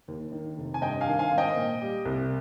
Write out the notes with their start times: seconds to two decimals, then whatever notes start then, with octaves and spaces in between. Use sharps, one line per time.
0.08 D#2
0.32 D#3
0.58 F1
0.74 G#5
0.82 G2 D#5 G5
1.01 F5 G#5
1.06 D#3
1.19 F5 G#5
1.31 G#1
1.38 D#5 G5
1.56 A#2
1.81 G3
2.05 C2